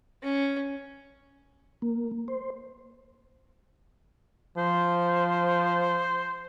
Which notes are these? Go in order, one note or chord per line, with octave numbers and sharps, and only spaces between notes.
C#4
A#3
C5
F3 C5